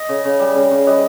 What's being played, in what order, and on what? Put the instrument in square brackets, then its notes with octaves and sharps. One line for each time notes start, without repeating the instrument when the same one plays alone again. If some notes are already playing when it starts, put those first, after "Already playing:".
Already playing: [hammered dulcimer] D#5
C#3
C#3
G3
C#3
C#3
G3 B4 D#5